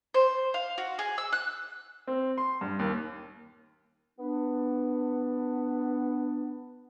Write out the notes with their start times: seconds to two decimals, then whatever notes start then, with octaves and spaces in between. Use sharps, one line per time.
0.14 C5
0.54 F5
0.78 F#4
0.99 G#4
1.18 E6
1.33 F#6
2.07 C4
2.38 C6
2.61 G2
2.79 D#2
4.19 B3 D4